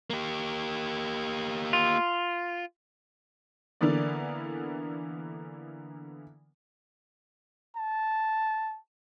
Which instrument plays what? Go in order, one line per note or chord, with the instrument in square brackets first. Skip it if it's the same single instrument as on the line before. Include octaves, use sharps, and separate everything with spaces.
[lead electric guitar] A#3 G4
[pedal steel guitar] F4
[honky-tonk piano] D3 E3 A#3 B3 D5
[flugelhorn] A5